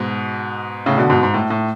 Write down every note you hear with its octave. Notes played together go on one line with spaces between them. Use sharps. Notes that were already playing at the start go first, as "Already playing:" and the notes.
Already playing: G#2 B2
A2 C#3
B2 D3
G#2 B2
G#2
A2
A2